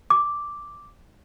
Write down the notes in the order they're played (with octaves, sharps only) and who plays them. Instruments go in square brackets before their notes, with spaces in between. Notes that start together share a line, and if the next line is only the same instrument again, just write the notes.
[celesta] D6